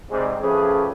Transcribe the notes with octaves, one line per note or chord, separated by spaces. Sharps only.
G#2 C3 G3
F3 A3 C#4 G4 G#4 B4